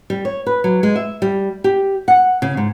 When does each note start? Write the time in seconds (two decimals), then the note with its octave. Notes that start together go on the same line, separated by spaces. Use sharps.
0.10 G3
0.25 C#5
0.47 B4
0.64 F#3
0.83 G#3
0.96 E5
1.22 G3
1.64 G4
2.08 F#5
2.42 C#3
2.57 G#2